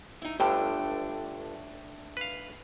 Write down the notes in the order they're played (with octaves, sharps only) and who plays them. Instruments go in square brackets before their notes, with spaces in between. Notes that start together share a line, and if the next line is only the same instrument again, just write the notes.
[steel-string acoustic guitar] D#4 E4
[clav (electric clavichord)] G1 G2 D3 [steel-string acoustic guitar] A3 D4 G5
[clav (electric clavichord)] B4 F5